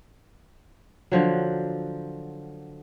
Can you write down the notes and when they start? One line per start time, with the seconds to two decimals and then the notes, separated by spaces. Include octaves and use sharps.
1.12 D3 F3 F#3